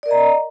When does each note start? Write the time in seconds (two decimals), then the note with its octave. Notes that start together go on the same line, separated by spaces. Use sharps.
0.03 D5
0.06 A#4
0.08 D#5
0.11 A#5